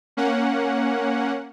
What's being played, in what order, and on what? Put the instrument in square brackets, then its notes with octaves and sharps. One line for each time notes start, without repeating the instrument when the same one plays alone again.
[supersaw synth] A#3 C#4 F#5